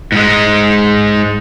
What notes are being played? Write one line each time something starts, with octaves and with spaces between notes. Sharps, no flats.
G#2 G#3